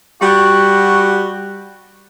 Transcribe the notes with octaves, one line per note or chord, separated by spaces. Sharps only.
G3 F#4